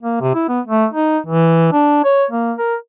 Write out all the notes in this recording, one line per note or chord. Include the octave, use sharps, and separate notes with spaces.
A#3
C3
E4
B3
A3
D#4
E3
D4
C#5
A#3
A#4